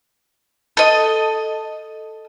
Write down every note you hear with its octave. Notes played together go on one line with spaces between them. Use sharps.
A4 D#5